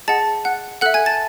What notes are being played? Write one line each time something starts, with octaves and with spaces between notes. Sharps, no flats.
G#4 D#5 F#5 A5 A6
F#5 F#6
A4 E5 F#5 F#6
G#5 G#6
A5 A6